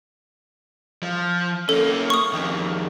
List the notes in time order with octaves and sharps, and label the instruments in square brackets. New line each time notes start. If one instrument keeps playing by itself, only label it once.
[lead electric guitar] F3
[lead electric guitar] A#3 C#4 [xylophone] A4
[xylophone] C#6 D#6
[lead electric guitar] F2 D#3